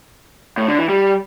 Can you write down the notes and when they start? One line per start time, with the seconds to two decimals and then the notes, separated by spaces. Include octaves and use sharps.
0.58 A2
0.68 D3
0.79 E3
0.89 G3